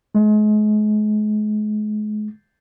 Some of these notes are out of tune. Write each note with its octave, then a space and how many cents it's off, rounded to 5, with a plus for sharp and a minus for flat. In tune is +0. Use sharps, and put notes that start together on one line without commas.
G#3 +35